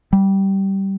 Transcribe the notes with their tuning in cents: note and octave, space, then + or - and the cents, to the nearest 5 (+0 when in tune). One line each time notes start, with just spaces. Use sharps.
G3 -15